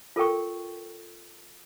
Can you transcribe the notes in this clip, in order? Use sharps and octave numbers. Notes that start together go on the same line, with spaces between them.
F4 A4 A#4 G5 C#6